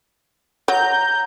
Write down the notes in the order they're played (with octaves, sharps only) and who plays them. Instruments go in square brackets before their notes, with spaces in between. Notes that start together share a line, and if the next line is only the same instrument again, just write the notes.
[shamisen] F#3 [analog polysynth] A#5 G6